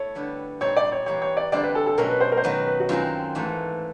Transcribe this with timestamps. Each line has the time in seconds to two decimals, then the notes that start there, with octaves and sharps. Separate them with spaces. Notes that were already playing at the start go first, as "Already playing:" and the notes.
Already playing: A3 E4 C#5
0.15 D3 G3 B3
0.61 A#2 G3 C4 D#4 C#5
0.77 D5
0.92 C#5
1.06 E3 G3 A#3 C#5
1.22 C#5
1.37 D5
1.52 D3 G3 C4 F4 D5
1.63 B4
1.75 A4
1.86 A4
1.98 B2 F#3 A3 C#4 A#4
2.09 B4
2.21 C5
2.32 A#4
2.37 C5
2.43 D#3 F#3 B3 B4
2.66 B4
2.80 F#4
2.89 F#2 D#3 G#3 C4 F4
3.35 G#2 E3 A3